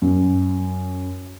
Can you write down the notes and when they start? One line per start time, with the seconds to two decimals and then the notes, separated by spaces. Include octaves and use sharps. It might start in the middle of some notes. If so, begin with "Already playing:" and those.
0.02 F#2